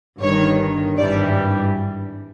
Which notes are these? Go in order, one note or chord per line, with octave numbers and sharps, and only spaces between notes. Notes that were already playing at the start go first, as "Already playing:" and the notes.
G1 G2 D#3 C#5
G#1 G2 E3 G3 D5